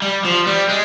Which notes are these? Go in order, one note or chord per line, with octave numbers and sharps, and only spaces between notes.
G3
F3
G3
G#3